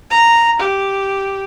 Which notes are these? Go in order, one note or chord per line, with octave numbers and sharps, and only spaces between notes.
A#5
G4